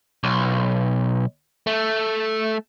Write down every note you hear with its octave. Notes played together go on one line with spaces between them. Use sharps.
B1
A3